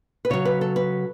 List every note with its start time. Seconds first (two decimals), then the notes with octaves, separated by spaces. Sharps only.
0.25 B4
0.30 C#3 F#3 C#5
0.45 B4
0.61 A4
0.76 B4